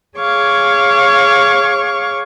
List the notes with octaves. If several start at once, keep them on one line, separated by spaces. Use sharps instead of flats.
G#4 C#5 F5 C#6 D6